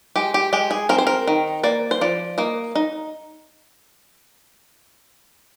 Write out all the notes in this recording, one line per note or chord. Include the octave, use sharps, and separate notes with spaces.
G#3 G4
G4
G#3 G4
G#4
C4 A#4
C5
A#4
D#3
A#3 D5
C5
F3 D5
A#3 D#5
D#4